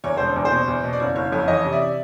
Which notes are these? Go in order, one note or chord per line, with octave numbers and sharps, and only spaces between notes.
E2 C#5
E1 C5
E2
C5
B2
E2
B2
D5
F#1 C#5
F#1 C#5
F2 C#5
E3 C#5 D#5
C3
D5 E5